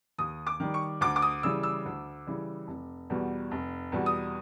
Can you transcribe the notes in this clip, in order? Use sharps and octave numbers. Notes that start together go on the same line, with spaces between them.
D#2 D#6
D6
D#3 G3
C#6
D2 D6
D6
D#6
C#3 E3 G3 E6
E6
D2
C#3 E3 G3
F1
E2 B2 G3
F1
E2 B2 G3
D#6